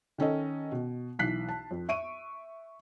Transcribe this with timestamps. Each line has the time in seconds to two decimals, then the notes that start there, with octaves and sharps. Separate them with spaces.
0.18 D#3 C#4 A4 D#5
0.72 B2
1.19 B1 E3 F#6 B6 C7
1.49 A5
1.71 F2
1.89 E5 C#6 D7 D#7